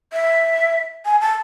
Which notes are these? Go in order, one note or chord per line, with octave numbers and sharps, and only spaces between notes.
E5
G#5
A5